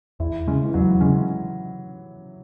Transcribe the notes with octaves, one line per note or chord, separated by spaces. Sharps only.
E2 E4
C#3 G#3 C#4
E3
E2 F#3
C#3 G#3 C#4